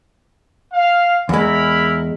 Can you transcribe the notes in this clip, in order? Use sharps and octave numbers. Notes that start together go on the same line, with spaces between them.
F5
E2 G#3 E4 A#4 B5